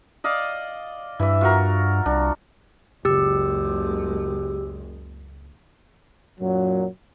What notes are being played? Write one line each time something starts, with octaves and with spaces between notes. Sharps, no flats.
D5 D#5 F5
G2 E3 E5
F4 F#4 A#4
C2 D4
F#1 C#2 A#2 G#3 G4 E6
F#2 A#2 F#3